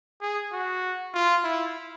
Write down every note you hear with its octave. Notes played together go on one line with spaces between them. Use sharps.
G#4
F#4
F4
E4